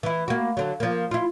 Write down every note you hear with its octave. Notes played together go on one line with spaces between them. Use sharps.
E3 E4
A#3 F#4
D3 F#3
F3 A#3
E4 F4